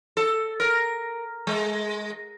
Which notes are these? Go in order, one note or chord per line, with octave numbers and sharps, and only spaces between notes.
A4
A#4
G#3